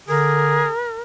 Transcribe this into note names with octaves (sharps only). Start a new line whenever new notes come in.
D3 G#4 A#4